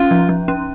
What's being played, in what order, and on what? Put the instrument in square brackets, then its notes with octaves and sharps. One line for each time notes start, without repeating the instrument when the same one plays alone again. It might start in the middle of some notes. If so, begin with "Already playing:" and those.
Already playing: [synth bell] C#4 [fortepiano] F4
[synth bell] F3
F3
C#4